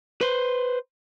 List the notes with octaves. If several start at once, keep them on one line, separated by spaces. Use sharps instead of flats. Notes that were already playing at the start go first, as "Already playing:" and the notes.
B4 C5